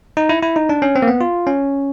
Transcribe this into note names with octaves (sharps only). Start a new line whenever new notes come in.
D#4
E4
E4
D#4
D4
C#4
C4
A#3
B3
F4
C#4